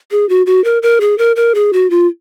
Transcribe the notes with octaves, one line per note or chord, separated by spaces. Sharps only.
G#4
F#4
F#4
A#4
A#4
G#4
A#4
A#4
G#4
F#4
F4